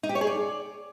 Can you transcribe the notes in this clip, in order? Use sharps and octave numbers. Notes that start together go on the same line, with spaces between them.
D#4
G4
C#5
G#4
D5